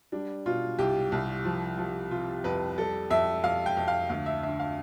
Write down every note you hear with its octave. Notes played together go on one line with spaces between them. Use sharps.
G3 D4
B2 F4
C2 G4
C2
F3
F3
C3 F4
F2 B4
G3 A4
F2 E5
F2 F5
G5
F2
F5
D2 F5
E5
D3 E5
F5